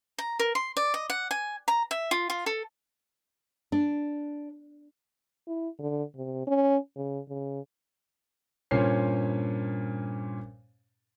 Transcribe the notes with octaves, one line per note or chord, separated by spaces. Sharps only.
A#5
A#4
C6
D5
D#5
F#5
G#5
A#5
E5
F4
F4
A4
D4
E4
D3
C3
C#4
C#3
C#3
G2 A#2 C#4 C5 C#5 C7